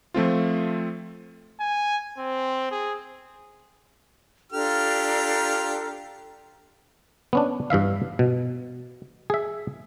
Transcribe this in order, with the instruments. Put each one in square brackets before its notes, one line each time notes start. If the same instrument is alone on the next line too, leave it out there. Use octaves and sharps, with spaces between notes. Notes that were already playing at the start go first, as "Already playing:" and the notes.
[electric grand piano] F3 A3 C4 F4
[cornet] G#5
C4
G#4
[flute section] D4 A4 A#5 [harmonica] F4 G4 F6
[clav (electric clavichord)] B3 C#4 D4
G2 E3 E5 F5
B2
G#4 E5